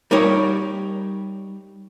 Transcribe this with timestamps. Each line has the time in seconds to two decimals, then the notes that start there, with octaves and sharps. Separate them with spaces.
0.11 G3 D#4 G4 A#4 C#5